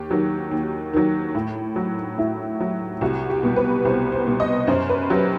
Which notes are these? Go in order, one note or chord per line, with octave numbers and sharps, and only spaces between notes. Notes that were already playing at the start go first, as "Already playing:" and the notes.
Already playing: D#2 G4
D#3 F#3
D#2
D#3 F#3
A2
F#3
A2 E4
F#3
C2 F#4
G4
B2 G3
B4
C2 C5
C5
B2 G3
D#5
F#2 C5
B4
F#3 G4